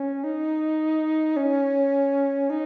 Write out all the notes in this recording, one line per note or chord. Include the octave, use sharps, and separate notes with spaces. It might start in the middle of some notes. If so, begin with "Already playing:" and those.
Already playing: C#4
D#4
C#4
D#4